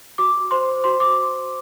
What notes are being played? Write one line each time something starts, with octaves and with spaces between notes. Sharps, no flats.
F#4 D6
C5 C6
F#4 C6
D6